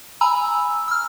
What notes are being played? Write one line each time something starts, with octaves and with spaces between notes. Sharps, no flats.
G#5 A#5 B5 E6
E6 F6